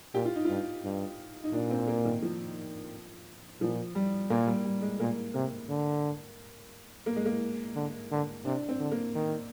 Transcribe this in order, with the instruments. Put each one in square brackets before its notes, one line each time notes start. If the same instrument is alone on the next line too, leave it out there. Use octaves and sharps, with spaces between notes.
[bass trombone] A#2 [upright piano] G4
[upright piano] F4
D#4
[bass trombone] G2 [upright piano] F4
[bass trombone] G2
[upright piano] D#4
[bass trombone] A#2 [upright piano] D4
[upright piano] C4
A#3
D#3
F3
[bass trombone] A#2 [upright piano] F3
[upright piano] G3
[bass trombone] A#2 [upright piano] A#3
[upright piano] G3
G3
G#3
[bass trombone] A#2 [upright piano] A#3
[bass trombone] C3 [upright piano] A#3
[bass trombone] D3
[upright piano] A#3
G#3
A#3
[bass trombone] D3
D3
[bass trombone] C3 [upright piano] D4
[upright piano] C4
[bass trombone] D3
[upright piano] A#3
[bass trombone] D#3